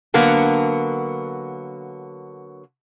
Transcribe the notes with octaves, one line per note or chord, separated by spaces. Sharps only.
D3 F#3 A#3 B3